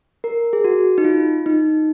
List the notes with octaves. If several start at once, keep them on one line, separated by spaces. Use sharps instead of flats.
A#4
G#4
F#4
D#4
F4
D#4